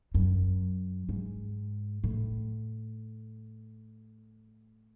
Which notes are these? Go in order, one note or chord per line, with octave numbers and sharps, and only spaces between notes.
F#2
G#2
A2